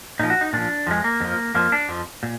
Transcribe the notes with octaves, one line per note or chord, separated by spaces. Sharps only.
A#2 F3 D#4
F#4
D#4
A#2 F3 D4
F2 F3 G#3
A#3
F2 F3
F2 F3 A#3
D4
F2 F3
A#2